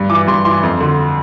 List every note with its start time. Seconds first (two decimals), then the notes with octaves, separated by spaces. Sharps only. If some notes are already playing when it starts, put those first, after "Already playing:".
Already playing: G2
0.10 E3 D6
0.27 G2 C6
0.45 E3 C6
0.63 F2
0.81 D3